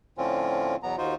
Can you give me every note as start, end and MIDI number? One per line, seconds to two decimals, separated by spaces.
0.18 0.76 45
0.18 0.76 50
0.18 0.76 53
0.18 0.76 60
0.18 0.76 61
0.18 0.76 65
0.83 0.96 40
0.83 0.96 47
0.83 0.96 54
0.83 0.96 59
0.83 0.96 82
0.98 1.14 39
0.98 1.14 63
0.98 1.14 65
0.98 1.14 66
0.98 1.14 72